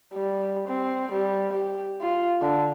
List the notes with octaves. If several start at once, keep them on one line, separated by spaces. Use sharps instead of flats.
G3
C4
G3
G4
F4
D3